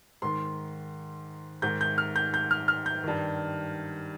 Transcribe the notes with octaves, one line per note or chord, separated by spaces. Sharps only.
G#2 D#3 C6
G#2 D#3 G6
G6
F6
G6
G6
F6
F6
G6
G2 D#3